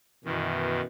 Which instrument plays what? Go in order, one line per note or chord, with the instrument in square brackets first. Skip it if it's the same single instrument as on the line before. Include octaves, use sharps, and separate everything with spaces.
[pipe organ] F#2 D#3 [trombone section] B2 E3